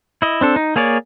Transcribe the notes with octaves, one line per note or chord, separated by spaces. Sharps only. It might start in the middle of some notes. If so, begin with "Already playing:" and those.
E4 D#5
C4 D4 A4
D#4
A#3 G#4 C#5 D5